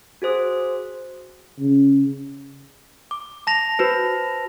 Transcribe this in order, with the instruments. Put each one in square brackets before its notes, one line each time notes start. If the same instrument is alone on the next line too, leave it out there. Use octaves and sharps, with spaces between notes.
[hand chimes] F#4 G#4 C5 D#6
[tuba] C#3
[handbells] D6
[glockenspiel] A5 A#6 F7
[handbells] F#4 B4 C5